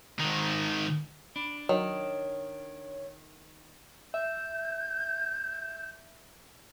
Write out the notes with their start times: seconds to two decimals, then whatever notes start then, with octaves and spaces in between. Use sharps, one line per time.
0.20 G#2 D#3
1.36 D4 B5
1.69 D#3 F#3 C#5
4.14 E5 G6